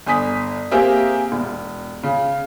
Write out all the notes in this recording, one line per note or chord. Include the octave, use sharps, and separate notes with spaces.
G1 G#5 D#6 B6
A#3 C4 G4 G#4 A#4 E5
E1
C#3